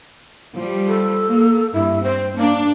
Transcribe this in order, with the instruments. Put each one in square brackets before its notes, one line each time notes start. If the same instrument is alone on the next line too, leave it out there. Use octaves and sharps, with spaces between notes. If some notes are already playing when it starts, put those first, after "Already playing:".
[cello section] F3 G3
[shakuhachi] A4
[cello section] A#3
[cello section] G2 [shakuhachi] E4
[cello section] C4 [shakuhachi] C5
[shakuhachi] A#3 [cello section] D4